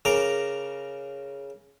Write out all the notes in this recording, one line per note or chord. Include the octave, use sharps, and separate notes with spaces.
C#3 A#4 A#5 D6